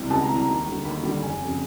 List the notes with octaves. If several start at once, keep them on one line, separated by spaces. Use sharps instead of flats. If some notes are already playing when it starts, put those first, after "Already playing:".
Already playing: C#2 C3 E3 G3
C#2 A5
A#5
C3 E3 G3
A#5
D#2
D3 G3
D#2 B5
D3 G3
F#1 G#5
F2 C#3